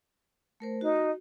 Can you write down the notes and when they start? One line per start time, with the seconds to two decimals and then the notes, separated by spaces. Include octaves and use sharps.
0.60 A3 A#4 C5
0.81 D#4 F#4